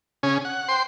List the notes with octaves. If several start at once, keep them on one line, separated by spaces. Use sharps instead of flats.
C#3 C#4 G#4
F#5
C5 G5 C6